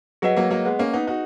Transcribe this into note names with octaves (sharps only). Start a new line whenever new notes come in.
F#3 G#4 B4 D#5 F#5
F#3 A#3
F#3 A#3
G#3 B3
A#3 C#4
B3 D#4
D#4 F#4